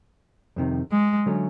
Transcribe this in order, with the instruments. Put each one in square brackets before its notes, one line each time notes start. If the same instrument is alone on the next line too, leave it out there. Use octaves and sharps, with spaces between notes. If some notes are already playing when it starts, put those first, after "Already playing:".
[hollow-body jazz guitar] F2 C3 D#3
[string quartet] G#3
[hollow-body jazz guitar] D3 F#3 A3 C#4